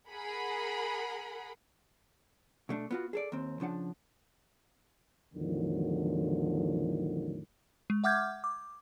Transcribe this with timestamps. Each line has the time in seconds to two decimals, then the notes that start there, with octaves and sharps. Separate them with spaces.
0.12 G#4 A#4 F#5 B5
2.69 B2 A3 D4
2.91 B3 F4 F#4
3.13 G#4 A4 D5
3.32 D#2 C4
3.60 C#3 F3 D4 F#5
5.34 E2 A2 D3 D#3 F3 F#3
7.90 G#3
8.04 E5 F#5 D6 F6 G6 G#6
8.44 D6